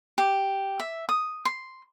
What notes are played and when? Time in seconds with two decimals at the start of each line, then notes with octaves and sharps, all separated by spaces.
0.18 G4
0.80 E5
1.09 D#6
1.45 C6